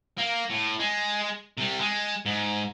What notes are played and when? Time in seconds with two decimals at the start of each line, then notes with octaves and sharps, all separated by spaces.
0.18 A#3
0.50 A2
0.79 G#3
1.58 C3 G3
1.80 G#3
2.26 G#2